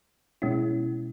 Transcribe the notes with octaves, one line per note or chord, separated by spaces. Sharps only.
B2 G#3 C#4 E4